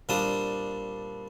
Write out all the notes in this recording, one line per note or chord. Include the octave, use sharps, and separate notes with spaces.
A#2 G3 C4 D4 A5 D#6